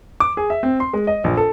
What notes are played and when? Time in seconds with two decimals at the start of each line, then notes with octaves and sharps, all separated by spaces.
0.20 D6
0.37 G#4
0.50 E5
0.63 C4
0.80 C6
0.93 G#3
1.07 D#5
1.24 A#1
1.37 A4